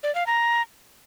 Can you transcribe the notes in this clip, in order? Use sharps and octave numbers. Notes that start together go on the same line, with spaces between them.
D5
F5
A#5